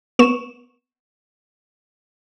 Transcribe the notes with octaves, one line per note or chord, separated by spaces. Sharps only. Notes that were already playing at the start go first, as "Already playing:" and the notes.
B3 C#6 E7